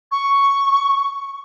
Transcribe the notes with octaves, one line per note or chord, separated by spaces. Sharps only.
C#6